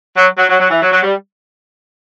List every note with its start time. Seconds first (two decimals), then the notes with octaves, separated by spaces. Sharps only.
0.16 F#3
0.38 F#3
0.49 F#3
0.60 F#3
0.71 E3
0.82 F#3
0.93 F#3
1.03 G3